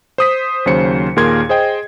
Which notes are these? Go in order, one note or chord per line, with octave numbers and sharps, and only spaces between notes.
C5 D#6 B6
D#2 C#3 F#3 C5 C#7
D#2 A#2 G#4 A#4 C6 G#6
G#4 C5 D#5 G5